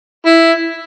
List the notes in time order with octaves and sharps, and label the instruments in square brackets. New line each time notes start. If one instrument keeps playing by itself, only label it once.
[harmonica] E4